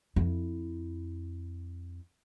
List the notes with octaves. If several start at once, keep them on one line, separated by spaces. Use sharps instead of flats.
F2 E4